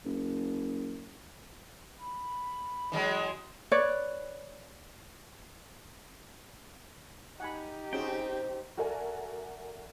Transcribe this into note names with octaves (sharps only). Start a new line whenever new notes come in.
F#1
B5
E3 F#3 G#3
B4 C#5 D5
D#4 G4 F#5 G#5 B5
C4 C#4 F#4 G#4 G5
F#4 A4 A#4 D5 E5 G#5